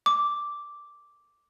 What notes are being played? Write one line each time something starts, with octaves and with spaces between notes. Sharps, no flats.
D6